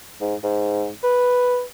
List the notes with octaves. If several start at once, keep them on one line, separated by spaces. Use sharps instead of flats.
G#2
G#2
B4